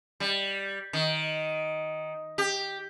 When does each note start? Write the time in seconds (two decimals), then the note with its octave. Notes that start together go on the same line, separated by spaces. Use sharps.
0.20 G3
0.93 D#3
2.38 G4